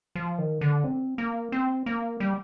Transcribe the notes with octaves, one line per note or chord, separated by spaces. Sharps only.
F3
D#3
D3
C4
A#3
C4
A#3
G3